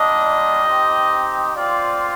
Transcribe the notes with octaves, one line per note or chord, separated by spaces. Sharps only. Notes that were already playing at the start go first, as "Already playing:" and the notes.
Already playing: G3 A#3 D4 F4 D#5
C4 D#4 G4
C4 F4 D5